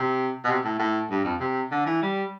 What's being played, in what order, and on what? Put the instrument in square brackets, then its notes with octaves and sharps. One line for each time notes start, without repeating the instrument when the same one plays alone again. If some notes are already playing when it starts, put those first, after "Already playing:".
Already playing: [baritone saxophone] C3
B2
C3
A2
A2
G2
F2
C3
D3
E3
G3